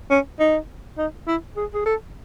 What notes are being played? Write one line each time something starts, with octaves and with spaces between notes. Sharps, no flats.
C#4
D#4
D#4
E4
G#4
G#4
A4